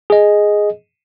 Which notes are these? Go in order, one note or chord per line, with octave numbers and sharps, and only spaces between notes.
G#4 D#5